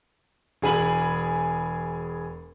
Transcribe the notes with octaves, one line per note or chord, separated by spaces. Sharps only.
E1 G#4 G#5 B5 F#7